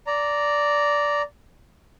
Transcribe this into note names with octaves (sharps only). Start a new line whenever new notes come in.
D5 A#5